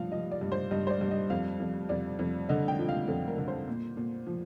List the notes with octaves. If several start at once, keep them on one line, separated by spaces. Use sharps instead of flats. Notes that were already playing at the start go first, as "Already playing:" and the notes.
Already playing: G2 F3 F5
F3 D#5
D5
G2
C5
G2 D#5
C5
D5
G2
D#5
F2 F5
F2
F2 D5
F2
D3 D#5
G5
F3
F5
F2 A4
A#4
D3
C5
A#2
A#2
F3